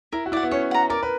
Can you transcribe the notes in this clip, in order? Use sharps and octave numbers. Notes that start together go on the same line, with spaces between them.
E4 A#4
F#4
E4 D5 F#5
B3
C#4 C#5
F#5 A#5
A#4 D5
B4